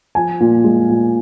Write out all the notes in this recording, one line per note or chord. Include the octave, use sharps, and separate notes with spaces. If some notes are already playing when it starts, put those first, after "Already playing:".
F3 G#5
A#2
G#3
A#2